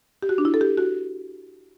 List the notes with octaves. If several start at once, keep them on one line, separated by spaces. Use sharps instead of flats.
G4
F#4
D4
E4
A4
G4
F#4